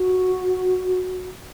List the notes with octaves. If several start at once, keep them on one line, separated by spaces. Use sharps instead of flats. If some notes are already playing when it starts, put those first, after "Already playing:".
Already playing: F#4